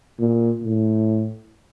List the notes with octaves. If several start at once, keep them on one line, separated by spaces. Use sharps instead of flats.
A#2
A2